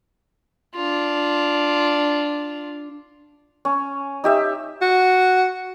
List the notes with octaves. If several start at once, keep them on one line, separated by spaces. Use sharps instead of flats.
D4 F4
C#4
D#4 G4 E5
F#4